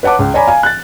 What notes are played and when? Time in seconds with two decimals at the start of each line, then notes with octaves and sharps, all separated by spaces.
0.03 B4 C#5 F#5 A5 D6
0.19 C#2
0.34 C#5 D5 G#5 A#5 B5
0.47 F5 G#5
0.63 F#6 A6